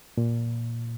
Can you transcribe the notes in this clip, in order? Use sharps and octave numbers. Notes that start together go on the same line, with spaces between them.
A#2